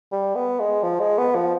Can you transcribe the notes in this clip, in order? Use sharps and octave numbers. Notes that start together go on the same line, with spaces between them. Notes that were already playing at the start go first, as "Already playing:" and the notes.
G3
B3
G#3
F3
G#3
B3
F3